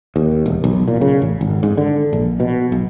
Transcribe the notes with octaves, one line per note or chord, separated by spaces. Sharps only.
D#2
E1
B1
A#2
C#3
A1
G#1
G#2
D3
A#1
B2
B1